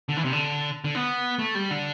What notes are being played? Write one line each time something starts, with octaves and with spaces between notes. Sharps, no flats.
D3
E3
C3
D3
D3
B3
A3
G3
D3